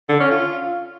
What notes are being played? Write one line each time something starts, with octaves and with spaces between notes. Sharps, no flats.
D3
C#4
F4